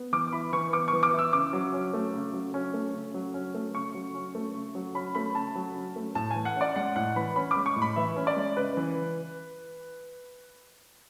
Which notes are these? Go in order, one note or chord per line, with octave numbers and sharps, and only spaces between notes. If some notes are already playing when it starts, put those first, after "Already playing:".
Already playing: B3
E3 D6
E4 B5
E3 C#6
B3 D6
E3 C#6
D6
E4
E6
C#3 D6
F#3
C#4
A3
C#3
F#3
C#4
A3
C#3
F#3
C#4
A3
C#3 C#6
F#3
C#4
A3
C#3
F#3
C#4 B5
A3 B5
C#3 A5
F#3
C#4
A3
A2 A5
E3 G#5
F#5
C#4 D5
G#3 F#5
A2 F#5
E3 B5
C#4 B5
D6
G#3
C#6
A2
B5
E3 E5
C#4
D5
G#3
C#3 B4
E3